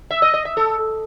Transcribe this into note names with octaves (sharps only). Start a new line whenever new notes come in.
E5
D#5
D#5
E5
A4